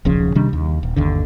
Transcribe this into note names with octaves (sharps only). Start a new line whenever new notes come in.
D#1 B1 C#3 F3
C3 D#3 G3 D4
D#2
D#1
G1 D#2 D3